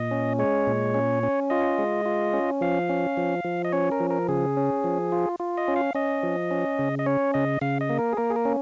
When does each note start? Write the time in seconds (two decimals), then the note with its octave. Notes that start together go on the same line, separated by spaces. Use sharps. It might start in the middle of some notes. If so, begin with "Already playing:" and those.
Already playing: A#2 D#5
0.11 C#4
0.39 G#3 C#5
0.67 A#2
0.94 C#4
1.23 C#4
1.50 F4 D#5
1.78 G#3
2.05 F4
2.33 C#4
2.61 F3 F5
2.89 C#4
3.17 F3
3.44 F3
3.65 D#5
3.72 C#4 C#5
3.92 A#4
4.00 F3
4.10 A#4
4.28 C#3 G#4
4.57 C#4
4.84 F3
5.12 F4
5.40 F4
5.58 D#5
5.68 C#4
5.76 F5
5.95 C#4 D#5
6.23 F3
6.51 C#4
6.79 C#3
6.99 D#5
7.06 C#4 C#5
7.34 C#3 D#5
7.61 C#3 F5
7.81 D#5
7.90 A#3
7.99 A#4
8.13 G#4
8.17 A#3 A#4
8.30 G#4
8.36 A#4
8.45 C#4